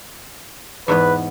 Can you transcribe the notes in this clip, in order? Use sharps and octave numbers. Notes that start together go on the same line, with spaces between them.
E2 G#2 B3 B4